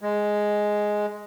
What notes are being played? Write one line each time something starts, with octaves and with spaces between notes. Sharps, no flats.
G#3